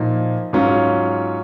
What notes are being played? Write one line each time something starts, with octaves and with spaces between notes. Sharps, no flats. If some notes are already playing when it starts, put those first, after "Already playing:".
Already playing: A#2 F3 A#3 D#4
G#2 F#3 C#4 F4